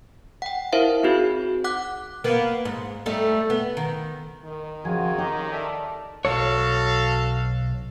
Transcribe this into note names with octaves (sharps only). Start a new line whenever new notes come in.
F#5 G5
E4 A#4 C5 E5 F5
C4 D#4 F#4 G#4
F#5 D6 F#6
A#3 B3
G#2
G3 A3 D#4
B3
D#3
D#3
C#3 F3 C4 F#4 G#5
D#4 G4 C#5 D#5 A#5
A4 D5 E5
B1 F#4 A4 C#5 F5